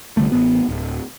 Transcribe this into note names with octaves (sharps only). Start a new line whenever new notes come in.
C2 D3 G3 A3
A1 B3
D1